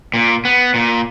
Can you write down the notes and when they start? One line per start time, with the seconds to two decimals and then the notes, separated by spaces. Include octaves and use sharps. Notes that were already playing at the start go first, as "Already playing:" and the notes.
0.14 A#2
0.45 B3
0.74 A#2